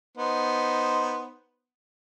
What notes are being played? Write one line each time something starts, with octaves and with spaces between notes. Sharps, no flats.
B3 D#4 C5